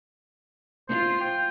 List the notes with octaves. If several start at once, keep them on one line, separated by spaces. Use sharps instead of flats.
F4 C5
G5